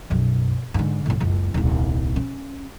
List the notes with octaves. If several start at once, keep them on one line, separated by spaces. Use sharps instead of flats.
B1 F#2
G#2 D3
A1 A2
F#1 C#2
D#1 C2
C#4